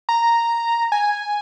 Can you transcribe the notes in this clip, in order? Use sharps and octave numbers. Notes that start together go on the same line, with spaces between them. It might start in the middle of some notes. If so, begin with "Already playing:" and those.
A#5
G#5